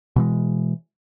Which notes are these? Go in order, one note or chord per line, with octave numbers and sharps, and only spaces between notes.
B2 E3 G#3